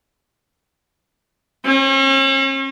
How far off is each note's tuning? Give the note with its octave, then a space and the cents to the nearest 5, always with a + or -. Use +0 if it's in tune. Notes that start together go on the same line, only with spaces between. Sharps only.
C#4 -40